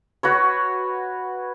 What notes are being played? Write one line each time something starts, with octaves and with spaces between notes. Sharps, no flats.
F#4 B4 C#5